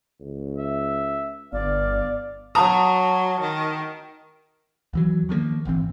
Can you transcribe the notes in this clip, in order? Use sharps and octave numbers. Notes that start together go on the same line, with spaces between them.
C#2
E5
G1 B3 D5 F5
F#3 A5 A#5 D#6
D#3
D#2 E3 F#3
D#3 F3 G3 A#3
D#1 G#1 E3 C4